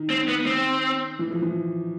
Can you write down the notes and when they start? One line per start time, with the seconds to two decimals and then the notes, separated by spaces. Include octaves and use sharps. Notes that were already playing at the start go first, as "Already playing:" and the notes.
Already playing: D#3
0.10 C4
0.28 B3
0.46 C4
1.19 E3
1.31 F3
1.42 E3